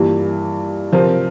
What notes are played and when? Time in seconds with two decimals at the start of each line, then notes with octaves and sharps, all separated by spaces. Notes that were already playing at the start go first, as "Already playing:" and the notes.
Already playing: G2 E3 G3 A#3 F4
0.92 C3 F3 C4 F4 A#4